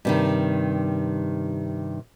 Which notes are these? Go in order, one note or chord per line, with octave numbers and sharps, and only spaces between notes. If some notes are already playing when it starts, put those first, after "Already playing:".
G2 C3 D#3